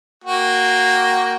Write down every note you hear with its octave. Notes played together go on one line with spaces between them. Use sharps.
A#3 F#4 G5